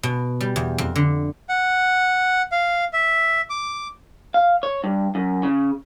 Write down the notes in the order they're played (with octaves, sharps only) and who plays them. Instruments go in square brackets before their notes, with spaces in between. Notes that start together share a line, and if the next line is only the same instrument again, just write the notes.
[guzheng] B2
G3
E2
F2
D3
[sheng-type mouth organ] F#5
F5
E5
D6
[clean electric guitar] F5
C#5
G2
F#2
C#3